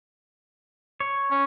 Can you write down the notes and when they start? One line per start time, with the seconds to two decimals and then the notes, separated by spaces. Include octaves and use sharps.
1.00 C#5
1.31 C#4